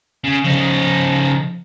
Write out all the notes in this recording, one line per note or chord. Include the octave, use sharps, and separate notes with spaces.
C#3
C#3 F3 D#4